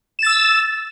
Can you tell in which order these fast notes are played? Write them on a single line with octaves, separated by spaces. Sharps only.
E7 A6 E6